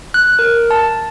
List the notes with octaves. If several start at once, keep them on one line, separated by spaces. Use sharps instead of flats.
F#6
A#4
A5